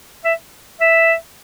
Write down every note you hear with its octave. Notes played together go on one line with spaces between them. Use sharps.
E5
E5